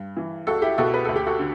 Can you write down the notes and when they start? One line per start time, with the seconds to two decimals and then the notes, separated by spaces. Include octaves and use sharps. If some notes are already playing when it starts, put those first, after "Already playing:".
Already playing: G2
0.17 E3
0.47 C#2 F#4 A4
0.62 E4 G4
0.78 B2 F#4 A4
0.94 B4
1.05 D2 A4
1.16 G4
1.27 F#4 A4
1.39 D3